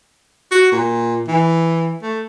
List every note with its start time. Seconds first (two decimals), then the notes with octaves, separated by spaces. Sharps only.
0.51 F#4
0.72 A#2
1.28 E3
2.02 A3